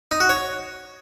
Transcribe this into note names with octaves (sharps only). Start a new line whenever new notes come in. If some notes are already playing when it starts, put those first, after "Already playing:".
D#4
F#4
C#5